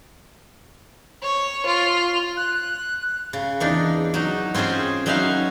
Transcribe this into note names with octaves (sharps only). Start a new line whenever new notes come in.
C#5
F4
F#6
C#3
E2 D4 D#4
F#3 D#4
C4 C#4 F4 G#4 C5
F#3 C#4 D#4 B4 E5 F5